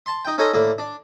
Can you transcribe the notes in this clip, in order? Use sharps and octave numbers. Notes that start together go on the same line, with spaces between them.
A5 C6
D#4 G5
C#4 D#4 A4 G#5 A#5 C6
A2 D3 A#3
D4